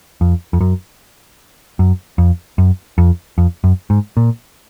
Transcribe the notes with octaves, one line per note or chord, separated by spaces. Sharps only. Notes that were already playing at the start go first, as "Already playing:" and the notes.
F2
F2
F#2
F#2
F2
F#2
F2
F2
F#2
G#2
A#2